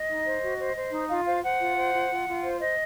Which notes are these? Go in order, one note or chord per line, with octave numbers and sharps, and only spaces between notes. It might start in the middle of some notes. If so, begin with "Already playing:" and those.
Already playing: D#5
D#4
C5
F#4
C5
C5
D#4
F4 F5
C5 F5
C5 F#5
F4
C5
F4
F4
F4
C5
C5 D#5